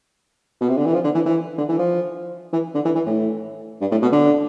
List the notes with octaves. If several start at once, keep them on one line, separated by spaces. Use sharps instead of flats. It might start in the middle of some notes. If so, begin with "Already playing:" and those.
B2
C3
D3
E3
F3
D3
E3
E3
D3
E3
F3
E3
D3
E3
E3
A2
G2
A2
B2
D3